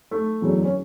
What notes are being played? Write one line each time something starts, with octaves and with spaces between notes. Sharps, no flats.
A3
F#1 E2 D3 F#3
C#4